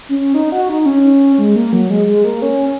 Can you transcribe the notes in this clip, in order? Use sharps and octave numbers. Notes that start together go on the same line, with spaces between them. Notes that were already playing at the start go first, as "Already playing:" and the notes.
C#4
D#4
F#4
D#4
C#4
G#3
A#3
F#3
G#3
G#3
A#3
C#4